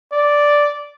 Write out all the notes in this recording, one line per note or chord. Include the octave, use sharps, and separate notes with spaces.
D5